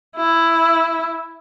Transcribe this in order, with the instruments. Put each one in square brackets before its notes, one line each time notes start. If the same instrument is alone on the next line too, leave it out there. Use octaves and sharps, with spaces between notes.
[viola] E4